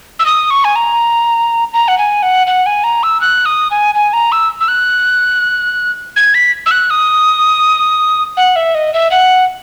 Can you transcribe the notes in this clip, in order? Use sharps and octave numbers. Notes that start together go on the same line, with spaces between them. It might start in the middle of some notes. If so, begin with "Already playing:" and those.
E6
D#6
C#6
G#5
A#5
A#5
F#5
G#5
F#5
F#5
G#5
A#5
E6
F#6
D#6
G#5
G#5
A#5
E6
E6
F#6
G#6
B6
E6
F#6
D#6
F#5
E5
D#5
E5
F#5